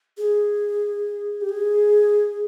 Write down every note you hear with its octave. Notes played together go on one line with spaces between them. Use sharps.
G#4
G4
G#4